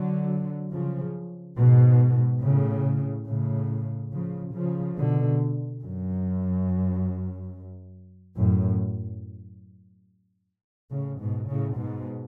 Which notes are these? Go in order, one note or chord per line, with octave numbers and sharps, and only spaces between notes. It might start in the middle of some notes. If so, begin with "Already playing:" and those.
Already playing: D3 F#3
C#3 F3
G#2 B2
A2 C#3
A2 C#3
C#3 F3
C#3 F3
B2 D3
F#2
F#2 A2
A2 C#3
G#2 B2
A2 C#3
G#2 B2